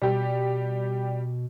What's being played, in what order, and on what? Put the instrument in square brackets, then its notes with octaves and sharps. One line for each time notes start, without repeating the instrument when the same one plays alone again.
[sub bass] B2 [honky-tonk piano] G3 G4